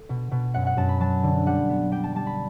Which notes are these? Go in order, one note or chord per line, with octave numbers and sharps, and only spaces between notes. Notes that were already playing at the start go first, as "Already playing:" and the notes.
Already playing: A4
B2
B2
F#2 F#5
F#5
F#2 A5
B5
F#3 A5
D3
G3 F#5
B3
G3 G5
A5
G3 A5
B5